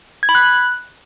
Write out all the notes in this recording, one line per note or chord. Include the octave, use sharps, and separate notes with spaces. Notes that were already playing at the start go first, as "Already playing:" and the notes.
G#6
B5
F#6